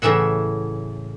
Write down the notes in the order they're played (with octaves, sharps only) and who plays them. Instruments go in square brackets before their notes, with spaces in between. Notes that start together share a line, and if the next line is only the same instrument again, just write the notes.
[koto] A2 C#3 E3 E5 F#5